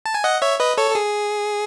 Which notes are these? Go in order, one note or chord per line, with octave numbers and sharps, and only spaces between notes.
A5
G#5
D#5 F#5
C#5 E5
B4 D#5
A4 C#5
A4
G#4